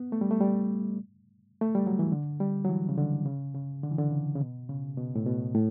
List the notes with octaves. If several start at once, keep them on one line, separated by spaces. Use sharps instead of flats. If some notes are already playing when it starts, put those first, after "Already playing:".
Already playing: B3
A3
G3
A3
G3
A3
G3
F#3
E3
D3
G3
F#3
E3
C#3
D3
C#3
C#3
D3
E3
D3
C#3
C#3
B2
C#3
B2
A2
B2
A2